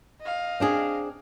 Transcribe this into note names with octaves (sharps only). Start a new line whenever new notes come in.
D#5 F5
C4 D4 G#4